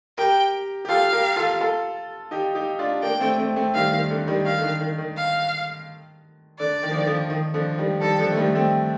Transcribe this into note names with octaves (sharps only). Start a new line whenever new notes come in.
G4 A#4 G5
G4
F4 A4 F5
G4 A#4
F4 A4
F4 A4
D#4 G4
D#4 G4
D4 F4
A#3 D4 G5
A3 C4
A3 C4
A3 C4
D#3 G3 F5
D#3
D3
D#3 G3
D#3 F5
D3
D#3
D#3
D#3
F5
D3 D5
D#3
F3
D#3
D3 F3
D#3
D3 F3
D#3 G3
D#3 G3 A4
D3 F3
A3
D#3 G3
A3 C4